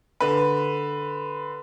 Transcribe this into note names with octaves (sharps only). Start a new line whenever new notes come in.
D3 B4